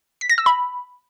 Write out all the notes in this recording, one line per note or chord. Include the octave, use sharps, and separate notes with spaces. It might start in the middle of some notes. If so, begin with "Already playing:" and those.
B6
A#6
E6
B5